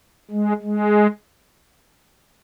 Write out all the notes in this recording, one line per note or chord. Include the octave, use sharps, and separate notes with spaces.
G#3
G#3